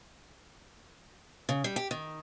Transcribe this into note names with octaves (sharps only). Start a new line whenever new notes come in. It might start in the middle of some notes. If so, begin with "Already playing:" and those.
C#3
G3
G4
D#3